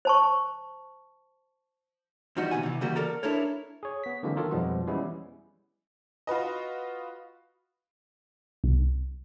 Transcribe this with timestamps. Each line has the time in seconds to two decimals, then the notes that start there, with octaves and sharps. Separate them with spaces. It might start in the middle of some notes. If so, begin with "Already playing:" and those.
0.05 C5 A5 C#6
2.36 E2 F3 G3 D#4 F#4
2.51 D#2 B2 F#5 G#5
2.63 C3 E3
2.81 C#3 E3 G3 A#3 F#4
2.96 A4 A#4 D5 A#5
3.23 D4 E4 A4 A#4 C#5
3.83 G#4 C#5
4.04 B3 B6
4.23 D3 E3 F#3 G#3 A#3 C4
4.36 D#3 F#3 F4 A4 A#4 C#5
4.51 F2 B2 F3 G3 G#3 B3
4.87 E3 G3 G#3 B3 C#4 E4
6.27 F4 F#4 B4 D#5
8.64 C2